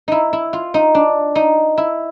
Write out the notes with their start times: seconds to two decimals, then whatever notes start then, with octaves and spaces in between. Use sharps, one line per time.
0.08 D#4 E4
0.33 E4
0.53 F4
0.74 D#4
0.95 D4
1.35 D#4
1.77 E4